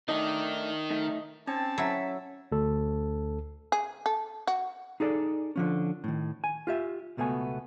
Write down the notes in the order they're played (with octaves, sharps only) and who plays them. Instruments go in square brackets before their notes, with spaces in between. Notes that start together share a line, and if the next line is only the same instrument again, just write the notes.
[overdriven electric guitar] D#3 [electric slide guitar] A3 D4 D#4 [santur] D#5
[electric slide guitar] A3 D#4
[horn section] C4 A5 [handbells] C#4 [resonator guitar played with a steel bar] C#5
[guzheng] F#3 E4 [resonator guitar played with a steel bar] A4 E5
[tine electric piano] D2 A4
[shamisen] G#4
A4
F#4
[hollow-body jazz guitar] D#4 G#4 A4 D5
D3 F3 C#4
A2 D#3
G#5
F4 G4 E5
C#2 B2 A3 B3 G#5